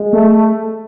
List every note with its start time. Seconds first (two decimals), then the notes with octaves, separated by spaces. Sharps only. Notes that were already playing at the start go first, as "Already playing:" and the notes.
Already playing: G#3
0.13 A3